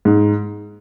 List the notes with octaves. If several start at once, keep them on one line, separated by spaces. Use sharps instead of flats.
G#2